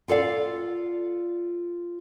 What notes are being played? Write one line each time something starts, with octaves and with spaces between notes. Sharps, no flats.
F4 A4 D5 F5